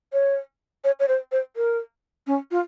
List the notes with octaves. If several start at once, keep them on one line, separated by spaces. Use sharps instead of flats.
C#5
C#5
C#5
C5
C5
A#4
C#4
F4